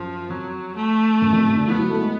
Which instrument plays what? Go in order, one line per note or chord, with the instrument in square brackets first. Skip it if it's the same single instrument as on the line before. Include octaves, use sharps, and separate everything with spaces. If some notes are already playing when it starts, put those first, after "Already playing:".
Already playing: [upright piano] F#2 [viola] F3
[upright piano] F2 [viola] F#3
[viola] A3
[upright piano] F#2
F2
F#2
D3
[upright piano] F3 [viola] B3
[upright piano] F#3
A3
G#3